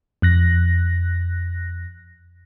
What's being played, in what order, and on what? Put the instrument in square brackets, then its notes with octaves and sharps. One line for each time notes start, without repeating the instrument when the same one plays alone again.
[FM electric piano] F2 F#6 A#6